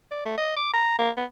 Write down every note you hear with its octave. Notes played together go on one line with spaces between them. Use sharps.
D5
A3
D#5
D6
A#5
A#3
B3